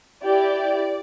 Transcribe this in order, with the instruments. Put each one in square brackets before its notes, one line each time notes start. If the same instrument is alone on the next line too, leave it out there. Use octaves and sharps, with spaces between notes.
[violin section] E4 G4 D5